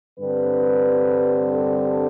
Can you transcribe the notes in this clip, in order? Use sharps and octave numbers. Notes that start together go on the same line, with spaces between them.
G2 D3 G3 C4 B4
A4